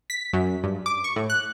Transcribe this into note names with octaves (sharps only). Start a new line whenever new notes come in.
B6
F#2
G2
D6
C#6
A2
F#6